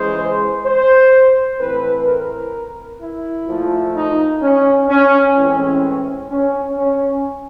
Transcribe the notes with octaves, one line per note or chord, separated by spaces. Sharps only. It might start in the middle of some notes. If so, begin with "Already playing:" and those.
Already playing: C#3 E3 G#3 C5
C5
A2 E3 A3 C4 B4
A#4
E4
A#2 F3 A3
D#4
C#4
C#4
A2 E3 G#3 C4 C#4
C#4
C#4